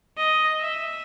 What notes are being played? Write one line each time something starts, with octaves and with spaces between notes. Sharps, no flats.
D#5
E5